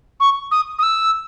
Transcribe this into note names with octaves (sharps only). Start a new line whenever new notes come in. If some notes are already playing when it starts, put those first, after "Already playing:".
C#6
D#6
D#6
E6